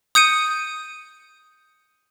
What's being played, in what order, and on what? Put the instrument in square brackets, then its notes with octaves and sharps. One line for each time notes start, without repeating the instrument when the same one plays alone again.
[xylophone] D#6 G6 C#7 D#7